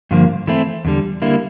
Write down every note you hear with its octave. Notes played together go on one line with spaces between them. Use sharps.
G2 D3 F3 A#3
E3 A3 C4 E4
E2 D3 G3
D3 G3 A#3 E4